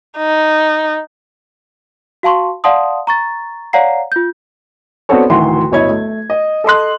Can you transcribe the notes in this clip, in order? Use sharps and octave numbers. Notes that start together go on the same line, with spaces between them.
D#4
F#4 F5 A5 C6 C#6
D5 F5 F#5 A5 C6 D#6
A#5 C#6 A6
C#5 D5 F5 F#5 A#5 C7
F4 G6
B3 C4 D4 F#4 A4 C#5
D1 D2 D#3 E3 F#4 C6
D1 G1 E4 C#5 D#5 G#6
A3
D#5
A4 D#5 C6 F#6